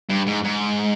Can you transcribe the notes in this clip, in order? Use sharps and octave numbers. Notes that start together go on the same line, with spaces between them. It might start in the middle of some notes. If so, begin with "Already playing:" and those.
G2
G#2
G#2